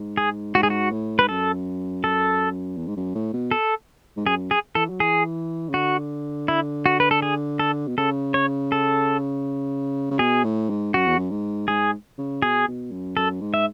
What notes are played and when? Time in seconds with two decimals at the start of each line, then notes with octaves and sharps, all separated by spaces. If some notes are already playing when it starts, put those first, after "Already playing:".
Already playing: G#2
0.17 G#4
0.55 G#2 F#4
0.63 G#4
0.70 F#4
0.92 A2
1.19 G#2 B4
1.29 F#2 A4
2.04 A4
2.77 E2
2.87 G#2
2.97 F#2
3.15 A2
3.33 B2
3.51 A4
4.17 G#2
4.26 F#2 G#4
4.51 G#4
4.75 E3 A4
4.90 F#3
5.00 E3 G#4
5.69 C#3
5.74 D3 F#4
6.48 E4
6.86 F#4
7.00 B4
7.11 A4
7.22 G#4
7.59 A4
7.88 B2
7.98 C#3 A4
8.34 C#5
8.72 A4
10.11 C#3
10.19 B2 G#4
10.44 A2
10.70 G#2
10.94 F#2 F#4
11.07 E2
11.18 F#2
11.31 G#2
11.68 G#2 G#4
12.18 C#3
12.42 B2 G#4
12.68 B2
12.91 F#2
13.17 F#2 A4
13.41 G#2
13.54 E5